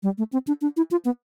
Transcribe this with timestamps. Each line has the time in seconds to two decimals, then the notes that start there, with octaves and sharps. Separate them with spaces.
0.03 G3
0.18 A3
0.33 C4
0.47 D4
0.61 D4
0.77 E4
0.91 F4
1.05 B3